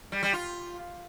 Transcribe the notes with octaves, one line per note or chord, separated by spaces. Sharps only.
G3
G3
F4